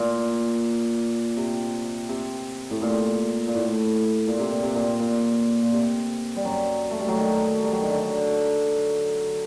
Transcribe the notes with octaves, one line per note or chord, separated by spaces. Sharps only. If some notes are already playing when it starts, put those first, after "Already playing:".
Already playing: A#2
C3
C3
A2
A#2
A#2
A2
A#2
C3
A#2
C3
A#2
A#2
A#2
C3
G3
F#2 F#3
A3
G3
F#3
D#3
G3
F#3
D#3
D3